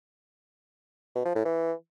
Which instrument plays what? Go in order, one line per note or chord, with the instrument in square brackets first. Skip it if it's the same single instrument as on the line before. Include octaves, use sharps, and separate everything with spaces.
[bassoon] B2
F3
A2
E3